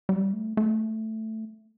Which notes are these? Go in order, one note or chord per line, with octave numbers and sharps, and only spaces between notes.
G3
A3
A3